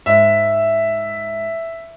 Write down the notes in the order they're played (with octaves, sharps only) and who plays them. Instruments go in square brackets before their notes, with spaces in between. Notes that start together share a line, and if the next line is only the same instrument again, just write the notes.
[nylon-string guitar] G#2 [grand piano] E5